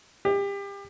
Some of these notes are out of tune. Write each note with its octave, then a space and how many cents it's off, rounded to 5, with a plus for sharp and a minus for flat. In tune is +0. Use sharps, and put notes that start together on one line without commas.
G4 +30